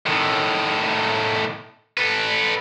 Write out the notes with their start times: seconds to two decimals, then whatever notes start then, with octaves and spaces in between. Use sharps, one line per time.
0.06 A2 D#3
1.97 A4 B4